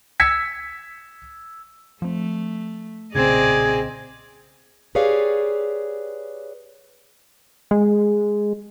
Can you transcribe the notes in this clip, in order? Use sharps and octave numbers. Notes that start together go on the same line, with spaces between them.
E6 G#6 B6 C#7
F3 A3 C4
B1 A#2 C#3 C4 G#4 D5 D#5 G#6
G4 G#4 B4 C#5 D5 F5
G#3